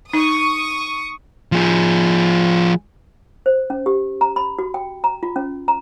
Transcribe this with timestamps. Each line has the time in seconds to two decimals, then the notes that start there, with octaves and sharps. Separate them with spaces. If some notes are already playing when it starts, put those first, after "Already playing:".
0.14 D#4 C#6 D#6
1.52 F3 G#4
3.46 C5
3.70 C#4
3.86 G4
4.21 A#5
4.36 B5
4.59 F#4
4.74 G5
5.04 A#5
5.23 F4
5.36 C#4
5.68 A#5